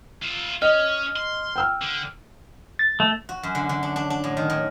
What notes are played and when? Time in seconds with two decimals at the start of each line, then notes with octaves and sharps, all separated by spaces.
0.22 F4 E5
0.62 C#4 D#5 F6
1.16 C6
1.56 G5 E6 F6
1.82 D3
2.79 A6
3.00 A3
3.29 F#4
3.43 F#2
3.55 D3
3.69 D3
3.83 D4
3.96 D4
4.10 D4
4.24 A2
4.37 D#3
4.50 A2